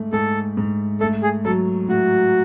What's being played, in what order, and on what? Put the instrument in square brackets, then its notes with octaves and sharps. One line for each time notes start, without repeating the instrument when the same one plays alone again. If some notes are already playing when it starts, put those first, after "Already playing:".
Already playing: [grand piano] G#2 A3
[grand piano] G#2 [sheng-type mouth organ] A4
[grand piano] G#2
[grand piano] A3 [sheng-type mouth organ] A4
[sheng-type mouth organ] G#4
[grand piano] F#3 [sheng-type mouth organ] A4
[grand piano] A2 [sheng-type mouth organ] F#4